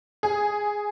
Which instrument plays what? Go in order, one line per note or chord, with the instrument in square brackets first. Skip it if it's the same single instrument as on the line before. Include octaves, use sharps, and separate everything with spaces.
[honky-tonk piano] G#4